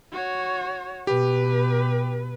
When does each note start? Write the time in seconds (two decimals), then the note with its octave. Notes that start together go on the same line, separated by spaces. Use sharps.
0.12 F#4 C#5
1.07 B2 G4 B4